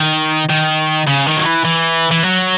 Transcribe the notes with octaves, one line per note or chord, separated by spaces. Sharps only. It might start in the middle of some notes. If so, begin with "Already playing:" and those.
Already playing: D#3
D#3
C#3
D#3
F#3
E3
E3
E3
F#3